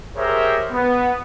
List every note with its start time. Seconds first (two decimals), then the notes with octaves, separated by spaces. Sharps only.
0.17 G4 G#4 A#4 C5 C#5 E5
0.72 B3